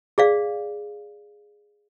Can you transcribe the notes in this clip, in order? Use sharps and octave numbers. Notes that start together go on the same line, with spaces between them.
G#4 D5 F5